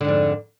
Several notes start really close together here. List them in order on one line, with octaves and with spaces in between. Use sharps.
D3 G#2 F2